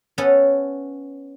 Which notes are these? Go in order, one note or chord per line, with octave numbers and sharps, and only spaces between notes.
B3 C#4 A4 C#5